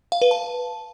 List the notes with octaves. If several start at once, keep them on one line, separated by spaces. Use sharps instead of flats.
F5
B4
A5